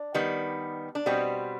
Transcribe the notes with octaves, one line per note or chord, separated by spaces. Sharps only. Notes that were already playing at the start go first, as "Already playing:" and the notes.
Already playing: D4
D#3 G3 B3
D4
B2 G3 B3 C4